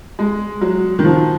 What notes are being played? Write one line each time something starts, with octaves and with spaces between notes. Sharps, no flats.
G#3
F#3
D#3
F3